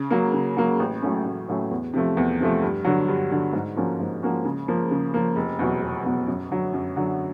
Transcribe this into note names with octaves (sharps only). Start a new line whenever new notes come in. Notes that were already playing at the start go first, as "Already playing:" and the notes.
Already playing: C#3
F#3 A#3
C#3
F#3 A#3
A1
A2 F#3 A3 C#4
A1
A2 F#3 A3 C#4
E2
C3 F3 A3
E2
C3 F3 A3
G2
D3 F#3
G2
D3 F#3
G#2
F3 A#3 C#4 F#4
G#2
F3 A#3 C#4 F#4
C#3
F3 A#3
C#3
F3 A#3
F1
E2 B2 F#3
F1
E2 B2 F#3
F#2
D3 F#3
F#2
D3 F#3